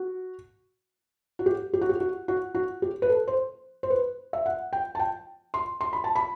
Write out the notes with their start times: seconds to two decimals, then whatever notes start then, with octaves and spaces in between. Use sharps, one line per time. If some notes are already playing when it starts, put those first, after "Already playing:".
Already playing: F#4
1.39 F#4
1.46 G4
1.73 G4
1.81 F#4
1.89 G4
2.00 F#4
2.28 F#4
2.55 F#4
2.82 G4
3.02 B4
3.10 A4
3.28 C5
3.83 C5
3.90 B4
4.33 E5
4.46 F#5
4.73 G5
4.95 A5
4.99 G5
5.54 C6
5.81 C6
5.93 B5
6.04 A5
6.16 B5